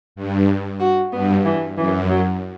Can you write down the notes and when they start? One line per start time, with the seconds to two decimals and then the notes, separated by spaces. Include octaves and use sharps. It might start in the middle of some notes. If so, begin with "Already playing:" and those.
0.16 G2
0.80 F#4
1.12 G2 B3
1.45 E3
1.77 F#2 E3
2.10 F#3